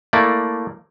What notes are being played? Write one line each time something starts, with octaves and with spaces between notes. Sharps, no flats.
A3 A#3 E4 D5